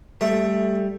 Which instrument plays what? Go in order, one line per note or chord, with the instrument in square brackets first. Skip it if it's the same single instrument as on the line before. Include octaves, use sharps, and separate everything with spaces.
[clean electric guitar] G3 [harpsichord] A3